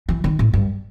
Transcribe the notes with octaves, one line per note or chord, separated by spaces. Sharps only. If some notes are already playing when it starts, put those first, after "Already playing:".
E3
D#3
A2
G2